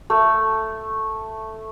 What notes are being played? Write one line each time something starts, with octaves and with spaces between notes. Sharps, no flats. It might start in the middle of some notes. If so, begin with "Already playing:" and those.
A3